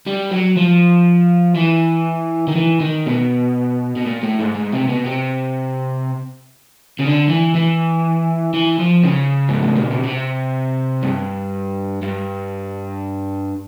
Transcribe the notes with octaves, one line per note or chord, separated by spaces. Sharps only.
G3
F#3
F3
E3
D#3
E3
D#3
B2
B2
A#2
A2
G#2
G#2
C3
B2
C3
C#3
D3
E3
E3
E3
F3
C#3
G#2
A2
A#2
B2
C3
G2
G2